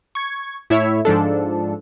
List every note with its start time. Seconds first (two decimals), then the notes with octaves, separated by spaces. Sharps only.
0.15 C#6 G#6
0.70 A2 E4 C#5 E5
1.05 G#2 F3 D4 A4